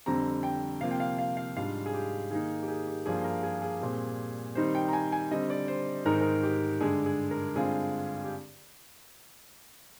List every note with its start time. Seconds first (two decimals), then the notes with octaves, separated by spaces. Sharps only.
0.06 F2 D3 G3 C4 A#5
0.43 G5
0.81 C3 F3 A#3 F4 F5
0.91 G5
1.00 F5
1.18 F5
1.37 F5
1.56 G#2 G3 D4 F4 F5
1.86 G#4
1.94 G4
2.31 D#3 A#3 D#4 G#4
2.63 G4
2.68 G#4
2.87 G4
3.06 G2 F3 A#3 F4 G#4
3.24 A#4
3.43 G#4
3.62 G#4
3.81 A#2 G3 C4
4.55 D#3 G3 C4 D#4 C5
4.75 G5
4.88 A#5
4.93 G#5
5.12 G#5
5.31 D3 G3 C4 D#5
5.50 D5
5.68 C5
6.05 G#2 D#3 G#3 D#4 A#4
6.14 C5
6.21 A#4
6.43 G4
6.80 G2 D3 G#3 G#4
7.06 G#4
7.31 A#4
7.55 G2 D3 G#3 C4 F4 G#4
8.24 G4